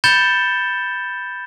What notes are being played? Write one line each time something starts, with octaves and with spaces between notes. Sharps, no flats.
B5 G6 A6 C#7 E7 G7